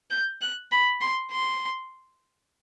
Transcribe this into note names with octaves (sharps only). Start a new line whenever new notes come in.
G6
F#6
B5
C6
C6